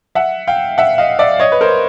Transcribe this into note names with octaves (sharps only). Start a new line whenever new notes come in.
E5 F#5
F5 G5
E5 F#5
D#5 F5
D5 E5
C#5 D#5
B4
A#4 C5